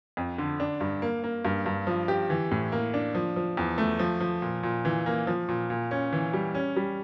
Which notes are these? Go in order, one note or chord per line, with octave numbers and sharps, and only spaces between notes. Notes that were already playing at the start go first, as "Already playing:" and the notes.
F2
D3
D4
G2
A#3
A#3
G2
G2
F3
G4
E3
A2
A#3
D4
F3
F3
E2
A3
F3
F3
A#2
A#2
E3
A#3
F3
A#2
A#2
C#4
E3
G3
C#4
G3